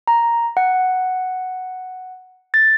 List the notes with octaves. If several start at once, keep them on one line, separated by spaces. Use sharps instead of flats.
A#5
F#5
A6